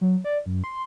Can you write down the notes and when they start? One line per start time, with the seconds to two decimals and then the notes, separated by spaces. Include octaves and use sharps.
0.01 F#3
0.24 D5
0.46 F#2
0.64 C6